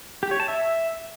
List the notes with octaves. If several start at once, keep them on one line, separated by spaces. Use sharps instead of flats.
G4
C#5
A5
E5